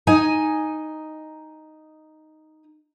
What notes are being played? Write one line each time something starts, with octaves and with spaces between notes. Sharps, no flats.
D#4 D#5 G#5